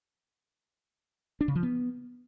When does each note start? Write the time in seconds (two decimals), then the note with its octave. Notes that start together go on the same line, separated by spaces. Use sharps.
1.41 D4
1.48 C#3
1.55 F3
1.63 B3